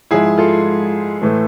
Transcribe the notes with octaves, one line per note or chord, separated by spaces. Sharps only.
G#2 F3 G#3 E4 G#4
F4 A4
A2 E3 A3